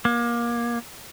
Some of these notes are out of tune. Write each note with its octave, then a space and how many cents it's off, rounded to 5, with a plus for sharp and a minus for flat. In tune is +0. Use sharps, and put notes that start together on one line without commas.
A#3 +25